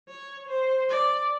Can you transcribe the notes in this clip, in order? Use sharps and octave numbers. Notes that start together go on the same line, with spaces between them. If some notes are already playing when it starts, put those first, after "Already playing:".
C#5
C5
D5